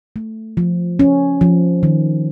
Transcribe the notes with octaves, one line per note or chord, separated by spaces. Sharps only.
A3
F3
C#4
F3
D#3